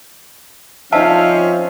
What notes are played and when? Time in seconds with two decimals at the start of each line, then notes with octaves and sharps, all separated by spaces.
0.92 F3 C4 C#4 D#4 E5 F5 A5